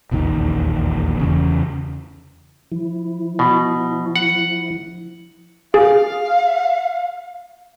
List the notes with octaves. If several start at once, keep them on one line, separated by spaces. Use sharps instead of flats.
E1 A#1 D#2 D#3
E2 C#3
F3 E4
B2
F#5
G#4 F5